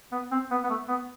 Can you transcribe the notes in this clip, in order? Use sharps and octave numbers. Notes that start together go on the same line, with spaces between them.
B3
C4
B3
B3
A3
B3